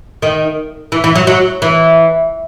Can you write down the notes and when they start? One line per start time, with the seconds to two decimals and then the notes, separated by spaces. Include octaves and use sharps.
0.22 D#3
0.92 E3
1.04 E3
1.15 F#3
1.27 F#3
1.62 E3